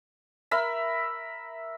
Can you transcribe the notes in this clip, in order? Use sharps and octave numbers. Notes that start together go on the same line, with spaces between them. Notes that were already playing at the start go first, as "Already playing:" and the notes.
A#4 E5 B5